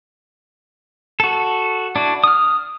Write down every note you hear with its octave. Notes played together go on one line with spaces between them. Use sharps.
F#4 A4
D4 E4 F#4
D#6 F6